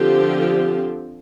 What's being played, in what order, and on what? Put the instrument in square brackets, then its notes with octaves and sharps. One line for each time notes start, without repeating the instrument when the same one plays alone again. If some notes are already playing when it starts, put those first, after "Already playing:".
Already playing: [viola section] D3 F3 C4 G4